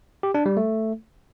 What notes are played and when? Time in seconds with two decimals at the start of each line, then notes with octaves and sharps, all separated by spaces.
0.23 G4
0.34 D4
0.46 G3
0.57 A3